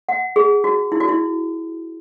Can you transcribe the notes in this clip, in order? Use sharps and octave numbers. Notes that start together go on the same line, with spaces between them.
F#5
G#4
F#4
E4
F#4
E4